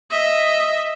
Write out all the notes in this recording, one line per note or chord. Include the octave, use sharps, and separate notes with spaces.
D#5 E5